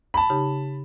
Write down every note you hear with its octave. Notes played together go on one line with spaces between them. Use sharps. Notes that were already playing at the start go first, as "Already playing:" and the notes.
A5 B5
C#3 D#4 G4